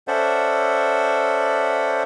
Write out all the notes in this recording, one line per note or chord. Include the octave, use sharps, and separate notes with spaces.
C#4 A4 C5 D5 E5 F#5